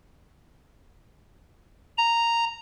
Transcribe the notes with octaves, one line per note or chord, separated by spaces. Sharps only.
A#5